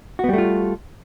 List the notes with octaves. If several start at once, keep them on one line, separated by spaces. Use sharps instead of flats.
G3 A3 B3 F4 F#4